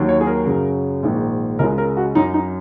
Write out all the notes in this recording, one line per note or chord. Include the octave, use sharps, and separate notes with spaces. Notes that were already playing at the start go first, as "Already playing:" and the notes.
Already playing: D#2 D#3 F#3
C#5
G#4
A#4
F#2 C#3 F#3
A#1 G#2 D#3
C#2 C#3 G#3 A#4
A#4
F#4
F#2 F#3 D#4
D#4